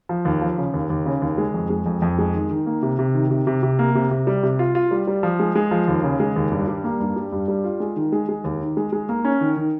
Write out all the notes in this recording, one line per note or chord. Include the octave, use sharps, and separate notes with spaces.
F3
D#2
F3
C#3
D#2
D#2
C#3
D#2
G#3
F2
G#3
F2
F2
G#3
D#3
D#3
A#3
C3
C3
D#3
C3
C3
C3
A#3
C3
C3
G3
C3
F4
F4
G3
G3
F3
G#3
G#3
F3
D#2
C#3
G#3
D#2
G2
G3
A#3
G2
G3
G2
G3
F4
G#3
D#3
G#3
G#3
D#2
D#3
G#3
G#3
A#3
C#4
D#3
D#3